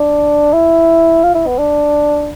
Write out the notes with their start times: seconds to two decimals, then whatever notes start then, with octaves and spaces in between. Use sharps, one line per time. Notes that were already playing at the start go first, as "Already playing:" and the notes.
Already playing: D4
0.53 E4
1.24 F4
1.35 E4
1.47 B3
1.59 D4